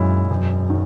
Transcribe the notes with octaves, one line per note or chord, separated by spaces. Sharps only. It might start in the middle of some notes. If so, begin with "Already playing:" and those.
Already playing: B1 F#2 A#2 G#3 C#4 E4
E1 F#2
D#3 F#3